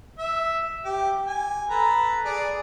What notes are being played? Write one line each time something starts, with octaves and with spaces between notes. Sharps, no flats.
E5
G4
G#5
A4 B4 A#5
G#4 D5